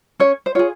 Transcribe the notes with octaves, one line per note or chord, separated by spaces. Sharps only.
C#4 C#5
C5
F4 G#4 C#5